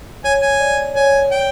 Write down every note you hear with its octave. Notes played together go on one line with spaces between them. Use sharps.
C#5 G#5
G#5
D5
C#5 G#5
G5